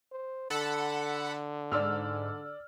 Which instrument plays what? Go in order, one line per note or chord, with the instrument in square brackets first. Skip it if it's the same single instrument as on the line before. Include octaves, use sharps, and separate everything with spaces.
[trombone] C5
[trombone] D3 [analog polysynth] A4 F#5 B5
[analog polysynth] G#2 [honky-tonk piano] D5 E6 F6